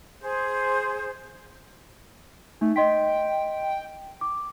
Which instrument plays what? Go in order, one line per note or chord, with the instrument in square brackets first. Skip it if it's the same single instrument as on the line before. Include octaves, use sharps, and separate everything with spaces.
[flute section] G#4 C5
[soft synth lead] A3 [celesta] D#4
[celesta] D#5 C6 B6 [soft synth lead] G5
[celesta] D6